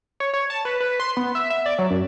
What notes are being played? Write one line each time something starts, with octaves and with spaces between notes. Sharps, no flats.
C#5
C#5
A5
B4
B4
C6
B3
E5
E5
D5
F#3
F#2